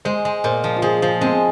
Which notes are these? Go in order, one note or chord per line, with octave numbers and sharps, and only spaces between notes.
G#3 C5
G#3
A#2 C5
F3
F4
F3 G#4
F3 F4
G#3 C4